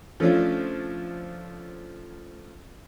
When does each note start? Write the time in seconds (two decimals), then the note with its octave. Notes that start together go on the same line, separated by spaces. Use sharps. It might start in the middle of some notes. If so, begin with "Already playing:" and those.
0.20 F3 A3 C#4 D4 F4